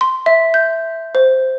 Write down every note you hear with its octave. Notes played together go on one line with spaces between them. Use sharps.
C6
E5
G6
C5